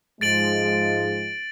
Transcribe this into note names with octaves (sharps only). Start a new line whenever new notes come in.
G#2 F3 G#3 A6 D7 F#7